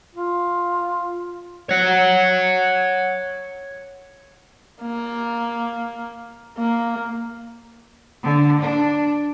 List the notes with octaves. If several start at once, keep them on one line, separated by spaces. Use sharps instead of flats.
F4
C#5 F#5
A#3
A#3
D3
D4